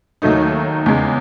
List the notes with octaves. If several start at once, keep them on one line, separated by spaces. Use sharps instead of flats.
D#2 D#3 F#3 A3 D#4
E2 C#3 G#3